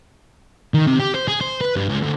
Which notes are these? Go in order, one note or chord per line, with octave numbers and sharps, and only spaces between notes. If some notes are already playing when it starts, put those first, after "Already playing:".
D#3
C3
G4
C5
G#4
C5
B4
G2
C#2
D2